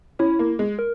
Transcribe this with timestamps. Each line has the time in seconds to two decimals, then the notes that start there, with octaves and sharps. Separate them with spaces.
0.19 C#4 E4
0.39 A#3
0.59 G#3
0.79 A#4